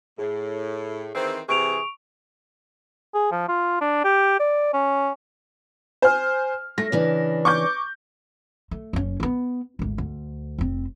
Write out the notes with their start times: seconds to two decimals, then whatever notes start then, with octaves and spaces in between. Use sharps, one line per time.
0.19 A2 G#4
1.15 D#3 E3 C4
1.49 C3 E3 G#4 C#6 D7 F7
3.14 G#4
3.32 F3
3.48 F4
3.81 D4
4.04 G4
4.40 D5
4.73 C#4
6.02 C5 G#5 F6
6.78 A3 A#6
6.92 C#3 E3 D4
7.45 C#6 D6 G6
8.71 A3
8.93 F#1 C#4
9.20 A#3 B3
9.79 G#1 D2
9.98 D2
10.58 F1 C4